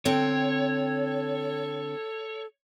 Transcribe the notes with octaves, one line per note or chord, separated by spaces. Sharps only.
D3 C4 A4 C#5 G5